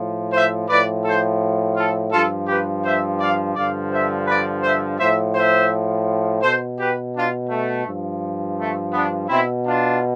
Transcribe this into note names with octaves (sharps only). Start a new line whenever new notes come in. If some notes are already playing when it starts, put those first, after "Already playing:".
Already playing: A2 F3
C5 E5
A2 F3 B4 D5
A4 C5
F4 A4
G2 F3 F4 A4
G4 B4
C5 E5
D5 F5
G2 D3 F3 D5 F5
C5 E5
B4 D5
C5 E5
A2 F3 C5 E5
C5 E5
B2 A4 C5
G4 B4
D4 F4
A3
G2 F3
A3
B3 D4
B2 C4 E4
D4 F4